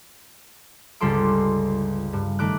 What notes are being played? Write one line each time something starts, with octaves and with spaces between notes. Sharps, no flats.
G1 C#2 G3 A4 C6 D6
G2
D#3 A3 D6 F#6